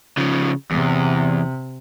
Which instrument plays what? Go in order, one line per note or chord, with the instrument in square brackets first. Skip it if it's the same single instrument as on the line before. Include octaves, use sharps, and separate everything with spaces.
[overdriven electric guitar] C#3 F3
[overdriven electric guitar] E2 [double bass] C3